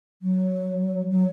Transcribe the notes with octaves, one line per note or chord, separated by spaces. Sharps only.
F#3
F#3